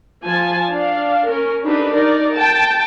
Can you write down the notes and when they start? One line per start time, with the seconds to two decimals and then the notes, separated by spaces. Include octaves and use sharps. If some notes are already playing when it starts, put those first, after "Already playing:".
0.24 F3 G#5 A5
0.69 D4 F5
1.27 C#4 A#4
1.64 D4 D#4 G4 A4 B4
1.92 D#4 A#4 D5
2.34 G5 A5